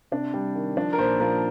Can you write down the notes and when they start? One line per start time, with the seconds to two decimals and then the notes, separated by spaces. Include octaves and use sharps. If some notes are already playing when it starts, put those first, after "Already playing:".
0.12 C3 D4
0.34 G3
0.55 D#3
0.77 F3 D4
0.93 A#4
0.98 A#2 C5
1.20 F3 A#4